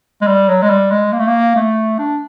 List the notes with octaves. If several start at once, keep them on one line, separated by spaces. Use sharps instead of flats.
G#3
G3
F#3
G#3
G3
G#3
A#3
A3
A#3
A3
D4